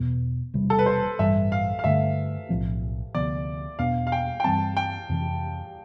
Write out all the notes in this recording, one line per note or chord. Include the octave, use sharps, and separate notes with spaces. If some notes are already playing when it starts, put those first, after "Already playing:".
Already playing: E2 B2 B3
E1 E2 C3 G3
A4
B4
C5
A1 G2 E3 G3 E5
F5
F5
G2 D3 A3 E5
B1 A2 F3 C4
D2 C3 F3 B3 D5
E2 B2 B3 D4 F5
F5
G5
G5
G2 E3 G3 C4 A5
G5
F2 C3 E3